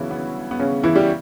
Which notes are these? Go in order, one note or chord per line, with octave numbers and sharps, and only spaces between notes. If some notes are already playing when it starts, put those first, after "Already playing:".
Already playing: G2 C#3 E3 F#3 B3 C#4 E4 F#4
B3
B3
C#3 C#4
E3 E4
G3 G4